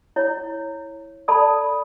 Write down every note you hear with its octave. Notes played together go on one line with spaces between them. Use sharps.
E4 C#5
A4 D5 A5 B5 D#6